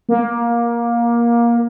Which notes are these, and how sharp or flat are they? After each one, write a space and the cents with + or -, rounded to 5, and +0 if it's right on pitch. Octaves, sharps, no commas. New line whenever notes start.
A#3 +15